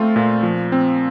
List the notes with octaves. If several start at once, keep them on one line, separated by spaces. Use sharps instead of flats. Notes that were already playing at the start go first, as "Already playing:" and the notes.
Already playing: A3 C4 F4
A#2
F3
C4